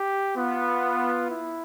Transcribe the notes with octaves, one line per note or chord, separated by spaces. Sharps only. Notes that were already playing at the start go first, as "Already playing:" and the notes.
Already playing: G4
B3 F4
E4